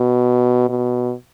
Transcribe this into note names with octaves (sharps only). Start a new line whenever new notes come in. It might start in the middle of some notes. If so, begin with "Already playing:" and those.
Already playing: B2
B2